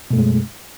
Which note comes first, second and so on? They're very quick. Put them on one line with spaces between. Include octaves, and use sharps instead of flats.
B2 A3 F#2 G#3